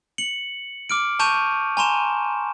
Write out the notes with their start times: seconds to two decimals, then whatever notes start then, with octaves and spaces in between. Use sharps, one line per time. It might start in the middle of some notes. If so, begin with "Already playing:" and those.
0.18 C#7 F#7
0.90 D6 F6 D7
1.19 A5 C#6 G6 D#7 F7
1.77 G#5 A#5 C6 E7